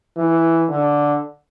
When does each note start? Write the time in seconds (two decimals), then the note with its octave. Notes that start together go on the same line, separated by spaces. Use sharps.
0.17 E3
0.69 D3